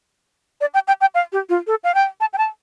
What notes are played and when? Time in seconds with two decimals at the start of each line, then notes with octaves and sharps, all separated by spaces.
0.61 D5
0.74 G5
0.87 G5
1.01 G5
1.15 F5
1.32 G4
1.49 F4
1.67 A4
1.84 F5
1.94 G5
2.20 A5
2.33 G5
2.38 A5